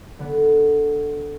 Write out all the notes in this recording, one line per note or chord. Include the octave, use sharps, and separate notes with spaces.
D3 B3